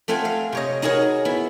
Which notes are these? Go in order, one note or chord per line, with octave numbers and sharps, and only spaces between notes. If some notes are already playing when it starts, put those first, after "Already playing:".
A3 C4 F4 F#5 G#5
F5
C3 C#5 D#5
D#4 F#4 G#4 A#4 C#5
B3 E4